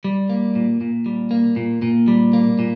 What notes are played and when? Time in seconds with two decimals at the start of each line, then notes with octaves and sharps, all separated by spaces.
0.04 G3
0.30 A#3
0.55 A#2
0.81 A#2
1.06 G3
1.31 A#3
1.56 A#2
1.82 A#2
2.08 G3
2.33 A#3
2.59 A#2